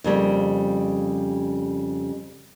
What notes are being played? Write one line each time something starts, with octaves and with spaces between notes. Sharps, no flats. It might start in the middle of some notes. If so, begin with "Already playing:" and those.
F2 C#3 G3 A#3